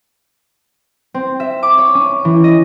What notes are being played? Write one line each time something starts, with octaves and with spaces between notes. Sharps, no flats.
C4
E5
D6
C#5
C#4
E3
D#5